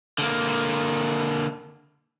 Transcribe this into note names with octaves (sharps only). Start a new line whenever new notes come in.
D3 A#3